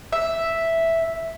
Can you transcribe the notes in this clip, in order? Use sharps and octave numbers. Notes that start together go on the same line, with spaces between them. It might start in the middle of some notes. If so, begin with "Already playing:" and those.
E5